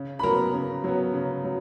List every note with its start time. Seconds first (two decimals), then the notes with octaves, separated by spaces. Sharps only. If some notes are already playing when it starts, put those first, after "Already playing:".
Already playing: C#3
0.19 B5
0.23 F#3 B3 A#4 A#5
0.54 C#3
0.84 F#3 B3
1.14 C#3
1.44 F#3